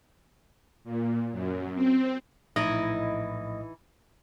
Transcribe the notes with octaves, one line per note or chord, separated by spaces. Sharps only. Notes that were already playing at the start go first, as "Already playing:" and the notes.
A#2
F#2
C4
A#1 A2 E3 D#4 E4 D#5